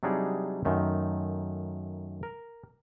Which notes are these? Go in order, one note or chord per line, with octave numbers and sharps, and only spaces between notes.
C3 F#3 G3 D4 D#4 G#4
F#2 D#3 A3
A#4